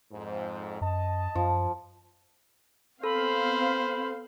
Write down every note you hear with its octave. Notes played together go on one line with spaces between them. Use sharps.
F2 G#2
F#2 D#5 A5
F#2 F3
B3 C4 A4 C5 F5 B5